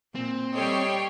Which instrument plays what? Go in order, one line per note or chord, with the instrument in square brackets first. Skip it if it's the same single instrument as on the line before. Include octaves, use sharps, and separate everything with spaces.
[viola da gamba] A#2 [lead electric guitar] C4
[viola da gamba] G3 A4 D#5 [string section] C#5 G5 C7